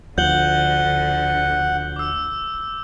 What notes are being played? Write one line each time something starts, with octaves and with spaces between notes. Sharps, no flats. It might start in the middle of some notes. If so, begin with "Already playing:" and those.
D2 D3 F3 F#5 G6 F#7 G7
D6 E6